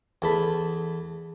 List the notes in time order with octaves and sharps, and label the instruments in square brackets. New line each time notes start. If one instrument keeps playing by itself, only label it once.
[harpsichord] E2 A4 B5